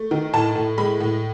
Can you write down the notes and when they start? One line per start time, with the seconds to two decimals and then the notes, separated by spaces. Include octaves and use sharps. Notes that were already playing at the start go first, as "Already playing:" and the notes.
Already playing: A3
0.11 D#3
0.33 A2 A5
0.56 A2
0.78 G#3 B5
1.00 A2